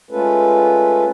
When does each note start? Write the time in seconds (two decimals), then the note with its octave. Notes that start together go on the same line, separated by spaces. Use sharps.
0.11 G#3 A3 C#4 F4 A4 B4